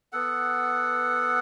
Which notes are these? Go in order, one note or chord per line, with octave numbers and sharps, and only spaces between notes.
B3 A4 F#5